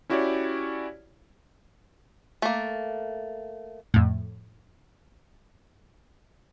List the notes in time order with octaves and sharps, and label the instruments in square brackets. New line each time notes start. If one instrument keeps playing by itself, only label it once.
[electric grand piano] C#4 E4 F#4 G4 C#5 D5
[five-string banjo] A3 A#3
[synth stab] F2 A2